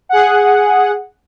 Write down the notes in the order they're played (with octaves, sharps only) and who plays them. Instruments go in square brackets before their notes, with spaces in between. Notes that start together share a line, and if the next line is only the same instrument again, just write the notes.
[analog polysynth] G#4 F#5